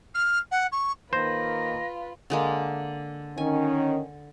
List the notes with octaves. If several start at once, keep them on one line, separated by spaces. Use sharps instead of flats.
F6
F#5
C#6
D#3 A#3 F4 B4 C5 A#6
D3 G#3 A#3
D#3 C#4 G#5